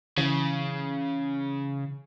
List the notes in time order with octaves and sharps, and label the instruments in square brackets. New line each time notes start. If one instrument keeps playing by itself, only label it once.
[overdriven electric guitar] C#3 [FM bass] E3